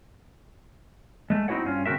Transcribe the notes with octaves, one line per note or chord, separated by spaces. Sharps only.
G#3 A3
C4 D#4 E4 F#4 C#5 F#5
G2 C#4 F4
C#3 C4 D4 F#4 A#4 E5